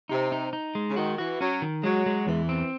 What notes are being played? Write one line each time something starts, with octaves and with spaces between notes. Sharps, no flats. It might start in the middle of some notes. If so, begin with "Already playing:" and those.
C3 D#4
D#4
D#4
G#3
C#3
D#3 F#4
E3 F#4
F#3 C#4
D#3
F#3 G#3
G#3
E2 E3
C4